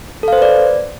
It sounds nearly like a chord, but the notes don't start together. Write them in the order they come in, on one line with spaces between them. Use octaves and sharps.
A4 F5 C5 B4 D5